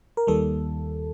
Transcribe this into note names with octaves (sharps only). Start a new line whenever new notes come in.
A#4
D#2 D#3 G3 A#3 A4